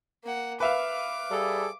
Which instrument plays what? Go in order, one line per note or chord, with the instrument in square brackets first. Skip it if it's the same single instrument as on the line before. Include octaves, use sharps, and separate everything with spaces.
[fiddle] A#3 F#5
[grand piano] B4 E5 F5 [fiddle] D6
[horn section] G3 G#4 A4